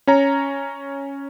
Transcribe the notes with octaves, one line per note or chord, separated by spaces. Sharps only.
C#4 C#5 A#5